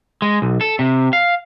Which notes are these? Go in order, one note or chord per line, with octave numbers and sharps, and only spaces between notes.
G#3
B1
A4
C3
F5